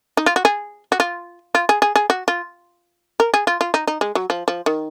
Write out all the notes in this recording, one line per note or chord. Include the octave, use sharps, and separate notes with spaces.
D#4
F4
F#4
G#4
F#4
F4
F4
G#4
G#4
G#4
F#4
F4
A#4
G#4
F4
F4
D#4
D#4
G#3
F#3
F3
F3
D#3